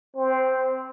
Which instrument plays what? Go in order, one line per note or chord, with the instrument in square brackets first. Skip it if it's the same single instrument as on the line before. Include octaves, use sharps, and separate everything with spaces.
[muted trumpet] C4